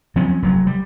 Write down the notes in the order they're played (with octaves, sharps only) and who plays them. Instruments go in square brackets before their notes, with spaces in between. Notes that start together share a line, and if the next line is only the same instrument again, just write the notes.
[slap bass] F3 F#3 C4 C#4
F1 F#3
G3